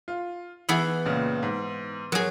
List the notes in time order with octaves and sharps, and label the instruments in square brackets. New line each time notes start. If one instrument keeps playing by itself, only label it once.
[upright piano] F4
[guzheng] E3 B3 G#4 [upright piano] E5 F#7
[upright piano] C#2 A#2 C#3
G#2
[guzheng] F#3 G#4 [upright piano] A#4